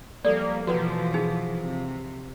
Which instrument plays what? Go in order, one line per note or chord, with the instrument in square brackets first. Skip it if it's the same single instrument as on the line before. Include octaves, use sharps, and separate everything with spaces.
[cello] F3 G3 [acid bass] A#3 [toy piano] A4 D5
[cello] B2 E3 [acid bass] F3 [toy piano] F#4 B4 F#5
[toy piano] D#4 G#4 G#5
[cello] C3